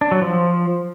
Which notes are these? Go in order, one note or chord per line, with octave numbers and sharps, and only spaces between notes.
D4
F#3
F3